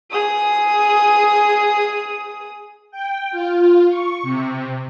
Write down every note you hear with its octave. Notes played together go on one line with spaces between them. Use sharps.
G#4 D#6
G5
F4
C#6
C3